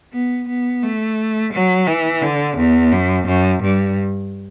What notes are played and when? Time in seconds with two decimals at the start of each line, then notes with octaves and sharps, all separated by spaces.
0.13 B3
0.48 B3
0.83 A3
1.53 F#3
1.87 E3
2.22 D3
2.58 E2
2.92 F#2
3.27 F#2
3.63 G2